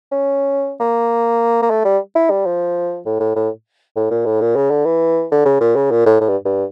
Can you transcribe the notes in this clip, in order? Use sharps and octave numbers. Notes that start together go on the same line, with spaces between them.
C#4
A#3
A#3
A3
G3
E4
G3
F3
A2
A2
A2
A2
A#2
A2
A#2
C#3
D3
E3
D3
C#3
A#2
C#3
A#2
A2
A2
G2
G2